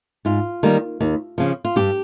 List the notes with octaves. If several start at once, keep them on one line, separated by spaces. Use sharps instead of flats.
G#2 F4
D#3 G3 A#3
D#2
C#3 F3
F4
G2 G4